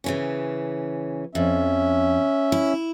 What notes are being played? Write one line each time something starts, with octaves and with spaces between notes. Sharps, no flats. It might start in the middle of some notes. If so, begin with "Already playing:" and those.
C#3 E3 C#4
F2 C#4 E5
E4